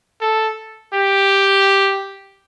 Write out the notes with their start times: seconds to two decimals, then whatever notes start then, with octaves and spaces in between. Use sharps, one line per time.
0.21 A4
0.93 G4